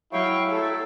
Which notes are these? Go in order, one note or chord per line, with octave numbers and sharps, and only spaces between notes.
F#3 E4 F5 G5 C#6
F#3 A3 A4